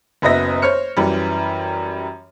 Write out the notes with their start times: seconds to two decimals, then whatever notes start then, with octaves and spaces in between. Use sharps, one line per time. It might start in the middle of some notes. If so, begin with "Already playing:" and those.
0.22 F#1 F#2 B3 D#5 E5 A#6
0.62 C5 C#5 F6 C#7
0.97 F#2 E3 G3